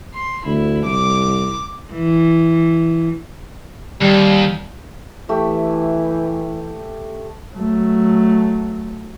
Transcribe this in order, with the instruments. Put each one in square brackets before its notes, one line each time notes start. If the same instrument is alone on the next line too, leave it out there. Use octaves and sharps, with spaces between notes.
[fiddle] C6
[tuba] D2 [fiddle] E4
[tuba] C2 [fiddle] D6
[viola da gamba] E3
[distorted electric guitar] D#2 [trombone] G3
[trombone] E3 [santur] A3 G4
[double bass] F#3 A3